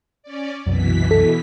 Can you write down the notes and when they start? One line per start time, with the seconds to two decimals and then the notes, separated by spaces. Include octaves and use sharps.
0.23 C#4 D5
0.67 C2 F#2 B2 E3 B6
1.11 A4